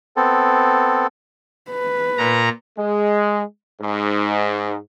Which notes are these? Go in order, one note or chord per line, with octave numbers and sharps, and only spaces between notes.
B3 C4 A4
B4
A#2 A#5
G#3
G#2